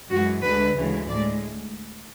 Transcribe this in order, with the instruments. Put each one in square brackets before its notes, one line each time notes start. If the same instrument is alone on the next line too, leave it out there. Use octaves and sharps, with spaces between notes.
[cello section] F#2 E3 G#3 F#4
D2 D3 G#3 B4
D2 C#3 E3 G#3
A2 G#3 D5